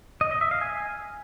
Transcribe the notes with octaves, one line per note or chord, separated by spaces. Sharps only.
D#5
D#5
E5
F5
G#5